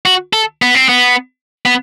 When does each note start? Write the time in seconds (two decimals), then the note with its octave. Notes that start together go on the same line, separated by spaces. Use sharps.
0.06 F#4
0.33 A4
0.62 B3
0.75 C4
0.89 B3
1.66 B3